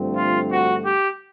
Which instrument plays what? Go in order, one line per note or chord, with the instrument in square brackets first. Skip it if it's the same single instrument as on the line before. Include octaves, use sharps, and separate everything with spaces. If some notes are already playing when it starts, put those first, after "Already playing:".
Already playing: [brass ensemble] G2 D3 F3 A3 C4
F4
F#4
G4